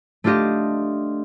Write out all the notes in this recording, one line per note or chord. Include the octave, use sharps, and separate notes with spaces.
A3 D4 F4 G4 D#5